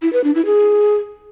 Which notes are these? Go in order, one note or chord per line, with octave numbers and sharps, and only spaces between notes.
E4
B4
D4
E4
G#4